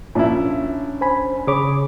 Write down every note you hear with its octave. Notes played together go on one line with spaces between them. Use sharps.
A#1 C#4 D4 E4 F4
C5 G#5 B5
C#3 G#4 C#5 B5 D6